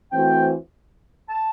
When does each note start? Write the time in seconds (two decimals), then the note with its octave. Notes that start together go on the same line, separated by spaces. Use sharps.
0.12 E3 A3 C4 F#4 C5 G5
1.29 A5